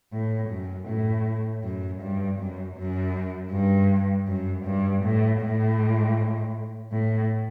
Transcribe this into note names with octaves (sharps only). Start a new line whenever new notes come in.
A2
F#2
A2
F#2
G2
F#2
F#2
G2
F#2
G2
A2
A2
A2